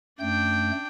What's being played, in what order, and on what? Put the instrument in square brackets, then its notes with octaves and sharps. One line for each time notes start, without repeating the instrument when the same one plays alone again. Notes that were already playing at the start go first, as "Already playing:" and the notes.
[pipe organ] F#2 A3 G6 [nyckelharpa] D4 G5